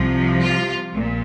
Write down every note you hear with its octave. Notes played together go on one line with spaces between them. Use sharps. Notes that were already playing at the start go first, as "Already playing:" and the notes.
Already playing: C2 C3 F3
F4
A#1 A#2